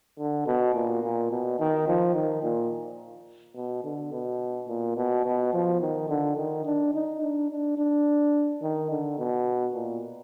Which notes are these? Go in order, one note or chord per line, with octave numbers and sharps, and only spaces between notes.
D3
B2
A#2
A#2
B2
D#3
F3
D#3
A#2
B2
D3
B2
A#2
B2
B2
F3
D#3
D3
D#3
D4
D#4
D4
D4
D4
D#3
D3
B2
A#2